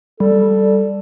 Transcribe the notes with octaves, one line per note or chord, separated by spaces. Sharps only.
G3 A4